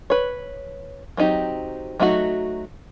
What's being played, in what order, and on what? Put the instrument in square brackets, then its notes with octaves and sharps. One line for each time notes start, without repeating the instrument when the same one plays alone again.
[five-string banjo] B4 C#5
F#3 C4 D#4 G4
F#3 A3 D#4 E4 F#4